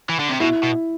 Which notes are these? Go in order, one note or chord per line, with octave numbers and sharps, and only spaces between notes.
E3
D3
C3
B2 E4
B2